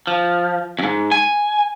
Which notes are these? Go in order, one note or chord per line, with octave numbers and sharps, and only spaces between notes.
F3
F2 G#2
G#5